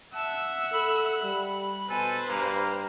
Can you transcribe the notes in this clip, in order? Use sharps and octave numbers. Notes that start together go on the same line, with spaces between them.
E5 F#5 A5 E6
A4 B5
G3
B2 A4 B4 C5 G#5
G2 A#3 A#5